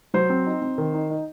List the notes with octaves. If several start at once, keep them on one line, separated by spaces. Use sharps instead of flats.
F#3 C5
C4
D#4
C4
D#3
D#4
D#4